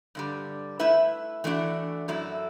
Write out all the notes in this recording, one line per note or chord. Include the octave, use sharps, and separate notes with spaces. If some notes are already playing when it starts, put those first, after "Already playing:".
G2 D3 G3
A3 E4 B4 E5
E3 A3 D4 F#4
F#2 F#3 A3 E4